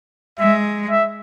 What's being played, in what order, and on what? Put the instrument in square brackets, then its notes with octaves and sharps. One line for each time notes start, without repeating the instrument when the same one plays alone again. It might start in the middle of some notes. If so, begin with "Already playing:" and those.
[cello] G#3 [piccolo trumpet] E5
[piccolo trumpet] E5